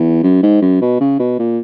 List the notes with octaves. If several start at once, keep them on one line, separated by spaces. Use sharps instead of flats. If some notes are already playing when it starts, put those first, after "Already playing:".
Already playing: E2
F#2
G#2
F#2
B2
C#3
B2
A#2